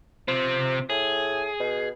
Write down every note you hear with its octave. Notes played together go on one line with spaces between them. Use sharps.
C3 F3 C4
A2 G#4
B2